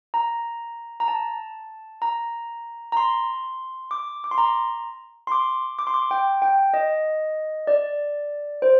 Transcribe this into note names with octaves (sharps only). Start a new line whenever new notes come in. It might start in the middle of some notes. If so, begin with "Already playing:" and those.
A#5
A#5
A5
A#5
A#5
C6
D6
D6
C6
A#5
C6
D6
D6
C6
D6
G5
G5
D#5
D5
C5